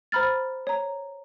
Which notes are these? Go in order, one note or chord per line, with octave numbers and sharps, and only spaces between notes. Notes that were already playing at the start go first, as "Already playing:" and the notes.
C5 A#5 B5 F6 A6
C#5 A#5